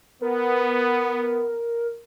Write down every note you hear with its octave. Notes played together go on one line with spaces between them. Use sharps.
B3 A#4